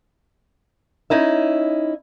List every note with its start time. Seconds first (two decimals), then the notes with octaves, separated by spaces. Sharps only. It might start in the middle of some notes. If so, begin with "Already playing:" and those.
1.10 C#4 D#4 E4 E5